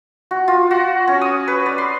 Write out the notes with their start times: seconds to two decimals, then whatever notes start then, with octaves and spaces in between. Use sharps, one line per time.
0.31 F#4
0.48 F4
0.71 F#4
1.08 C#4
1.21 D#6
1.48 B4
1.66 D5
1.78 C6